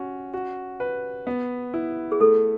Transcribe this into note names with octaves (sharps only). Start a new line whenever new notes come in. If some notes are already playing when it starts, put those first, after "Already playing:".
Already playing: C#4 F#4
F#4
B4
B3
E4
G#4
A3 A4